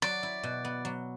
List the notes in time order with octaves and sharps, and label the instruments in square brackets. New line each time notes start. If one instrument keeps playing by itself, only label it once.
[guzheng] F#3 [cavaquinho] D5
[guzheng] E4
B2
B3
F#3